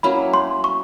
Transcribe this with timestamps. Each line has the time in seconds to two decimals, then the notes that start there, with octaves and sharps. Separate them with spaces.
0.03 F#3 A#3 C#4 E4 B5
0.34 C6
0.64 C#6